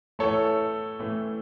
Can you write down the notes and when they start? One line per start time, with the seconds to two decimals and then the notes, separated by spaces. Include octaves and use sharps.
0.19 A2 E3 A3 A4 C#5
0.99 A2 E3 A3